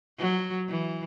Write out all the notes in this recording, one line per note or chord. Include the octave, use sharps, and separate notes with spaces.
F#3
E3